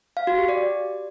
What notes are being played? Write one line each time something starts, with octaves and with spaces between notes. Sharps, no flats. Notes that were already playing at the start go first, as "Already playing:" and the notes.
F5
F#4
G4
D5